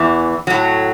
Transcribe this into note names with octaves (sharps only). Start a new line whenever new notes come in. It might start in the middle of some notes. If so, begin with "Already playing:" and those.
Already playing: E2 E3
A2 F#3